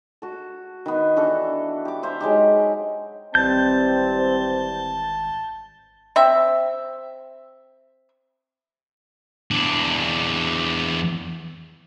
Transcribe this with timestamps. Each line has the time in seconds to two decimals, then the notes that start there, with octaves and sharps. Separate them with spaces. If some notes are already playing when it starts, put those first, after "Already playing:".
0.22 F#4 A4
0.86 D#3 B3
1.16 E3 D4 F#4 A4
1.85 G4 D6
2.03 C5 E5 F5
2.20 F#3 G#3 D#4 G4
3.35 G#1 E3 G3 C4 A5 G6
6.16 C4 E5
9.51 E2 D4